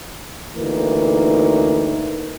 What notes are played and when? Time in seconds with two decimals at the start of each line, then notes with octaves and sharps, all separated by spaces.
0.56 D2 E3 A#3 D#4